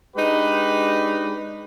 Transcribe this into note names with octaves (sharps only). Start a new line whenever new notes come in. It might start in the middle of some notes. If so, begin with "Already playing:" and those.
G#3 D4 D#4 G4 B4